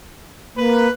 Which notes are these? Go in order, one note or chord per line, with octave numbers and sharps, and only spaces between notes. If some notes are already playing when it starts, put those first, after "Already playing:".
A#3 B4